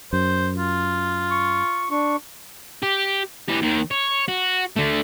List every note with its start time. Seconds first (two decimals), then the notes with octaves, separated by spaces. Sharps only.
0.13 F#2 C5
0.56 F4
1.31 C#6
1.91 D4 C#6
2.83 G4
3.49 E3 G4
3.62 D#2 D#3
3.91 C#5
4.28 F#4
4.76 D3 A3